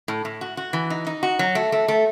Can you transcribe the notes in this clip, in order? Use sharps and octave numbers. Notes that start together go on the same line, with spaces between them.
A2
A2
F#4
F#4
E3
D#4
D#4
F#4
F#3
A3
A3
A3